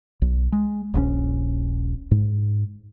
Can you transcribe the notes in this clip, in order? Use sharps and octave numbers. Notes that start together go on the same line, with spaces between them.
B1
G#3
D#1 A#1 A#2 C#4
G#2